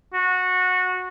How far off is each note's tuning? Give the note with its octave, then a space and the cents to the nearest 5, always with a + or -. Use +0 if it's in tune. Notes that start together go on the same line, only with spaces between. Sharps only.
F#4 -15